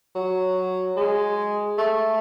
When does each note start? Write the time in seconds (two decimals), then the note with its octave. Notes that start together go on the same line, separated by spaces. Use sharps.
0.16 F#3
0.97 G#3
1.78 A3